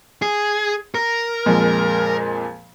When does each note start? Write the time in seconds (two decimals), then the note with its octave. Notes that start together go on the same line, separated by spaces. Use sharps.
0.22 G#4
0.95 A#4
1.46 F2 A#2 G#3